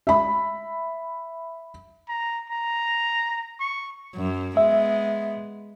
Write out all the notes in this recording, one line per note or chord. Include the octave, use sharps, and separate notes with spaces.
E5 B5
A#5
A#5
C#6
F#2
G#3 B3 E5